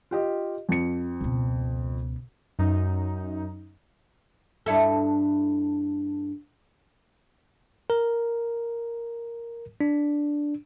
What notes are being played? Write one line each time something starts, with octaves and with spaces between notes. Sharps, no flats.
F4 G4 D#5
F2 C#7
C#2 B2
F#2 D#4
G2 E4 A4
A#4
D4